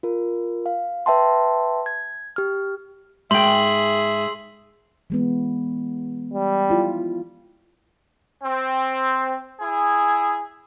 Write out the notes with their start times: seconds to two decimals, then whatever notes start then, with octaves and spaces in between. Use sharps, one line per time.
0.03 F4 A#4
0.66 F5
1.06 B4 E5 G5 A5 C6
1.86 G#6
2.36 G4 F6
3.31 G#2 G#4 E5 G5 C6 F#7
5.10 E3 G#3 B3
6.34 G3
6.70 E4 F4
8.43 C4
9.60 E4 G#4